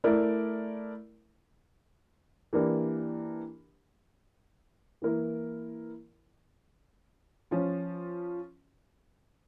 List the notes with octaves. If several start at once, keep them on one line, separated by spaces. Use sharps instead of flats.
A3 E4 A#4 D5
E3 A#3 D4 G4 A#4
E3 A#3 E4 A#4
F3 C#4 F4